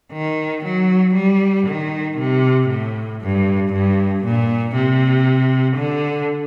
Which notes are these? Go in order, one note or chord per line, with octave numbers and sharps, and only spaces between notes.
D#3
F#3
G3
D#3
C3
A2
G2
G2
A#2
C3
D3